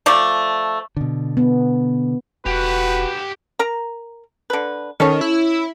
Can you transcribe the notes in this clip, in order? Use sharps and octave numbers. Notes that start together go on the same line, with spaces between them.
F3 A3 D5
B2 D3
B3
E1 F#4 G4 B4 F#5
A#4 A#5
D3 B4
D#3 C#4 A4 C#5
E4